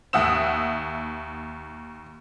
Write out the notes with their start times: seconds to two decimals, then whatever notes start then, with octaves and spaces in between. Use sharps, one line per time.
0.13 D#2 E5 F#5 D#6 E6 E7